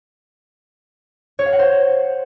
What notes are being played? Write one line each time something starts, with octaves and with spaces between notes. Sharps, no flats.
C#5
F5
F#5
C5